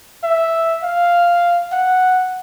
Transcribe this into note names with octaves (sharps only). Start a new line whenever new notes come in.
E5
F5
F#5